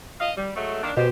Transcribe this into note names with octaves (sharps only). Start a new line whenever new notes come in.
D#5 F5
G3
F#3 G#3 A3
D#3 A#3 D4
B2 G4 C5